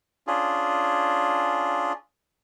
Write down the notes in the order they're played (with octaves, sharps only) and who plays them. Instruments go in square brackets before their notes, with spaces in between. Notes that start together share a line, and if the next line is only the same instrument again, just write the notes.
[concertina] C#4 D4 F4 G#4